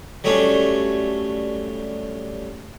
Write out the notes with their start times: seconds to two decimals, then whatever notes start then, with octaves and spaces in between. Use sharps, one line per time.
0.24 F#3 G3 A3 C#4 D4